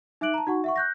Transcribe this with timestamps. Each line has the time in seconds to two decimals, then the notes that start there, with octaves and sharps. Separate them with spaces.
0.21 D#4 E5 D6 F#6 D7 F#7
0.34 A5 A#5
0.47 D#4 F#4 F#5 C#6
0.64 E5 F#5 C#6
0.76 F#6 G6 A#6